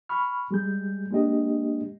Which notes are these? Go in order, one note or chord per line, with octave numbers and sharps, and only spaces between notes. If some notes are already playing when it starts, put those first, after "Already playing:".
B5 C#6 F6
G3 G#3 G6
G#3 A#3 D4 G4 D#5